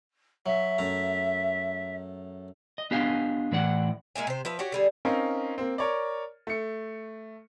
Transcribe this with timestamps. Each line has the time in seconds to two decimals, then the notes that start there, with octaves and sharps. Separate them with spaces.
0.46 F#3 E5
0.78 F#2 A3 A#5
2.78 D#5
2.91 B3 D4 G4 D#5 F5 G#5
3.52 A2 E3 D5 F#5
4.15 G#3 A#3 E5 G#5
4.27 C3 C5
4.45 F3 B4 E5
4.59 F#4 G4 C#5
4.72 D3 G3 G#4
5.05 C4 C#4 D#4 A#4 F5
5.58 A#3 C4
5.78 A#4 C#5 D5
6.47 A3 C#7